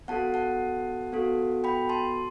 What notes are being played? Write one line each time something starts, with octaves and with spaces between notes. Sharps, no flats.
B3 F#4 A4 F#5 A5
F#5 A5
B3 F#4 A4
G5 B5
A5 C6